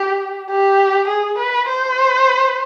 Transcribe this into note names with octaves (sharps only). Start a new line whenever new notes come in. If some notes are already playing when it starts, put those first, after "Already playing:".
Already playing: G4
G4
G#4
B4
C5